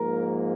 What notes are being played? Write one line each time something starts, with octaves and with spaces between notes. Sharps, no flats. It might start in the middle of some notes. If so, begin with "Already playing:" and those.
Already playing: G#2 F3 A#3 A#4